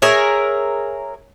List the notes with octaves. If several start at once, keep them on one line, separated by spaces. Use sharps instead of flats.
G#4 A#4 C#5 E5